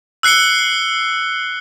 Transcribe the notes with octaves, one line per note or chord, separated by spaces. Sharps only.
E6 F#6 C7 C#7 G7